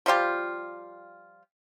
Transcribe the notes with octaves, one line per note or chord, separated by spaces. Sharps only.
F3 G3 F4 G4